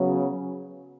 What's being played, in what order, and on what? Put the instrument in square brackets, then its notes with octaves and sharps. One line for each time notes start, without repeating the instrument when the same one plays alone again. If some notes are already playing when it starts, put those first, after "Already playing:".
Already playing: [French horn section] C#3 F#3 B3